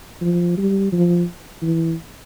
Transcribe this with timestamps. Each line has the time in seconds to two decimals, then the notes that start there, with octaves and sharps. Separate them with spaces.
0.22 F3
0.57 G3
0.92 F3
1.62 E3